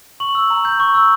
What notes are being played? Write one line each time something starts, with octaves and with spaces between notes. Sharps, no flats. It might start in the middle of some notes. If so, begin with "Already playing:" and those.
C#6 F#7
E6
A#5
G6
C#6
E6